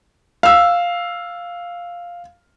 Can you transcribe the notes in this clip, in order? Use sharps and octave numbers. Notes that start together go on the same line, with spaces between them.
F5 E6